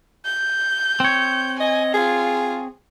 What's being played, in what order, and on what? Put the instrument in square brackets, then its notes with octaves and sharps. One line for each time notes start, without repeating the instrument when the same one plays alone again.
[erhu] G6
[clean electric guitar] C4 C#5
[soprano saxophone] D#5 [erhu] G#5
[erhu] F4 [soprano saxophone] G#4